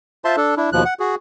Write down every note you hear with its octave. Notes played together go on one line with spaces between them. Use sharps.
F4 C5 E5 A5 C6
D4 A4
D4 E4
D#2 B2 F3 F#6
F#5
F#4 G#4